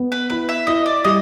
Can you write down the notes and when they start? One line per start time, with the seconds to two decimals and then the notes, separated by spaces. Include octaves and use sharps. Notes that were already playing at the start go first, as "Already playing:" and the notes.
Already playing: B3
0.12 B4
0.30 E4 B4
0.49 E5
0.67 E4 D#5
0.86 D5
1.05 G3 D#5